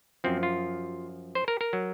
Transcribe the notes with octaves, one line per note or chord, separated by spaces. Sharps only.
F#2 F3 C4
F4
C5
A#4
A#4
F#3